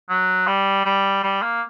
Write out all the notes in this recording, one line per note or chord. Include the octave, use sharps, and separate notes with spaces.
F#3
G3
G3
G3
A#3